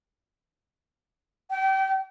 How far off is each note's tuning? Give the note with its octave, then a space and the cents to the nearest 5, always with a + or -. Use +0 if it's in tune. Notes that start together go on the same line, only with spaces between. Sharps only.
G5 -30